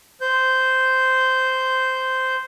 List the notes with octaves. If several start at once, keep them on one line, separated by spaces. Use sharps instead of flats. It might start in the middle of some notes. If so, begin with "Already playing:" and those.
C5 G6